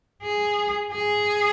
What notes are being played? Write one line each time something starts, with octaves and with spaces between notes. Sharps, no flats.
G#4
G#4